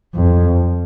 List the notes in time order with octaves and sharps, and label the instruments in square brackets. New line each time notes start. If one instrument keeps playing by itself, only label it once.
[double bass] F2